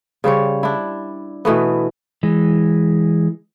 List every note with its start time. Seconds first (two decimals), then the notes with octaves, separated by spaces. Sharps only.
0.24 C#3 G3 C5 C#5
0.63 D4 E4
1.45 B2 E3 A3 B3
2.23 E3 G#3